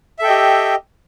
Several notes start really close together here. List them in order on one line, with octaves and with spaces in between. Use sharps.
E5 A4 G5 D#5 G4